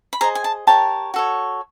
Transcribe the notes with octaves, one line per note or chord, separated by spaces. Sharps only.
B5
G#4 C5 D#5 A#5
G#5
A5
G4 A#4 C#5 A5
F#4 A4 C#5